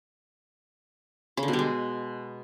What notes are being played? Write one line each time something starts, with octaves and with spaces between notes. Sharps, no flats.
C#3
D3
B2
G3
G#3